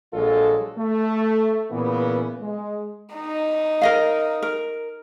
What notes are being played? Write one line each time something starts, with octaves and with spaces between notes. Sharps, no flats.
A#1 F#3 G#3 F4 A4
A3
A#2 C#3 E3 A#3 B3
G#3
D#4
A#4 D#5 F5
A#4